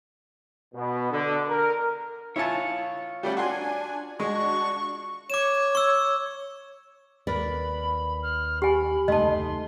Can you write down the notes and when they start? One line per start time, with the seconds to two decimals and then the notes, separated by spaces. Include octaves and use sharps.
0.74 B2
1.10 D3
1.48 A#4
2.36 E4 F4 C#5 G#5 A5
3.23 G3 A3 C#4 F#5 G5
3.37 D4 F#4 G#5 C6
4.20 G#3 D4 F#4 C#6
5.30 C#5 D6 E7
5.75 C#6 E6
7.27 D#2 A#4 B4 D5 B5
8.22 F6
8.62 G4 G#5 B5
9.08 F1 D#2 C#3 A3 D#4 D#5 A5 C6